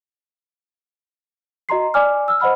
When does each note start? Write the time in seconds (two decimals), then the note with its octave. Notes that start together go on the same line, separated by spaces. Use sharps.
1.69 F#4 D#5 A#5 C6 C7
1.94 D5 G#5 D6 F6
2.28 E6 F6
2.40 C5 D#5 F#5 B5 F6